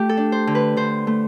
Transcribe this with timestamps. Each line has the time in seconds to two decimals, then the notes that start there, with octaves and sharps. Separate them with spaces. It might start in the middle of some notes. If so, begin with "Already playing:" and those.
Already playing: A3 F4 G4
0.09 A4
0.17 D4
0.32 C5
0.47 D3
0.55 B4
0.77 D3 C5
1.07 A3